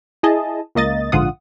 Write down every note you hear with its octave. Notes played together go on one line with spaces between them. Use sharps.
E4 G#4 D#5 A5
C#2 A#3 D#5 A6
A#1 G#2 D3 F4 F#5 D#6